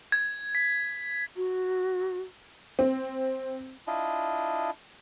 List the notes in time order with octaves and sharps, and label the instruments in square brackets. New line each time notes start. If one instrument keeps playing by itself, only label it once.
[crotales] G#6
B6
[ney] F#4
[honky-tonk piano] C4
[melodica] D4 E4 F4 D#5